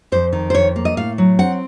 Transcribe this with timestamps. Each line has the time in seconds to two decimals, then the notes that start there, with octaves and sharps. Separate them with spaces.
0.12 F2 C5
0.33 D#3
0.50 C5
0.54 F2 C#5
0.76 A#3
0.85 D#5
0.97 A2 F5
1.18 F#3
1.39 C4 F#5